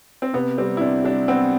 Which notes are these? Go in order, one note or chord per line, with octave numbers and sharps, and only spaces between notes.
C4
C3 B3
G3 C4
E4
C3 D4
G3 D4
B3 C4